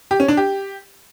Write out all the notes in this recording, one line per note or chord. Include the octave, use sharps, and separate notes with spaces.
G4
C#4
D4
G4